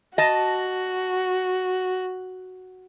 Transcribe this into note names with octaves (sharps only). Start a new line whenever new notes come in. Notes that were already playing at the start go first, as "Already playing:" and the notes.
F#4 D#5 A5